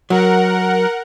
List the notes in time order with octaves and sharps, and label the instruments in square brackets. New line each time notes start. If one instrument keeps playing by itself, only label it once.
[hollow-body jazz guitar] F#3 [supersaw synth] A#4 F#5